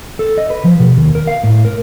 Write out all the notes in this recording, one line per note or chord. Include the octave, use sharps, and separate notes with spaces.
A4
D#5
B4
F3
B2
D#2
A#4
F5
A2
A#4